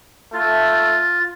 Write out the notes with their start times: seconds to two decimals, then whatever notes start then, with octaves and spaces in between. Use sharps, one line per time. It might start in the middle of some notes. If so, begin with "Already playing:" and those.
0.33 A3 F4